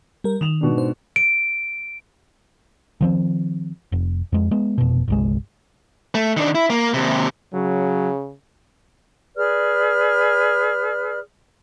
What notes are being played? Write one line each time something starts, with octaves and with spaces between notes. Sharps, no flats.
G3 A#4
D#3 E7 F7
G#2 B2 D4
C5
D7
D#3 F3 C4
F1
F2 G#3
G#3 B3
F1 B2
G1 C2 G#3
A3
D#3 D4
E4
A#3
D#2 C3
C#3 F#3
G#4 B4 D5 F6